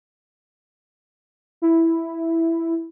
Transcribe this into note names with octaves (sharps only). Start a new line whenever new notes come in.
E4